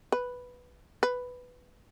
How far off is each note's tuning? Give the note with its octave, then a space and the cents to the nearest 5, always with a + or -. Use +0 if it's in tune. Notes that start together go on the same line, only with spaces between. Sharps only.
B4 +0
B4 +5